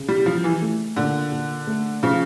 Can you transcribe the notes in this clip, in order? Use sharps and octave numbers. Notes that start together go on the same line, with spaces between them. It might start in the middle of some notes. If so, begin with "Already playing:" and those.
Already playing: C#3
G3
F3 G3
E3
A3
A#2 D3
A#2
A3
C#3 F3